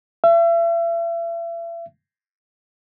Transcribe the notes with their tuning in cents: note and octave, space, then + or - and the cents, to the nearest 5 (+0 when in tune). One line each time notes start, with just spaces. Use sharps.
E5 +40